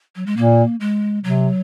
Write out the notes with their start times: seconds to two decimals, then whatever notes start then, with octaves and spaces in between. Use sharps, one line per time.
0.16 F#3
0.26 G#3
0.37 A#2 A#3
0.80 G#3
1.23 C3 F#3